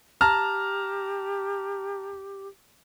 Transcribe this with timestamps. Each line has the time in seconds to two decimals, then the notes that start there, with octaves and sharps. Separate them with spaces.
0.21 G4 A5 A#5 F6